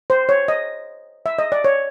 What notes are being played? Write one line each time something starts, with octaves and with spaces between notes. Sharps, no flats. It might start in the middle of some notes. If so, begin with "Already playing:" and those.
C5
C#5
D#5
E5
D#5
D5
C#5